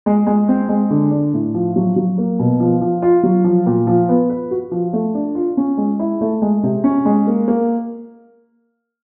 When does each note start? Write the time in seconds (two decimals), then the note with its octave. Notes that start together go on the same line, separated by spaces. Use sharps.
0.06 G#3
0.27 G#3
0.48 C4
0.69 G#3
0.90 D3
1.11 D4
1.33 A2
1.54 F3
1.76 F#3
1.96 F#3
2.18 A#3
2.39 B2
2.60 F3
2.82 F3
3.02 F4
3.23 F#3
3.44 F3
3.66 A#2
3.87 F3
4.09 B3
4.30 B4
4.51 F#4
4.71 F3
4.93 A3
5.15 D4
5.35 F4
5.57 C#4
5.77 G#3
5.99 E4
6.21 A3
6.42 G#3
6.63 C3
6.84 C#4
7.05 G#3
7.27 A#3
7.48 A#3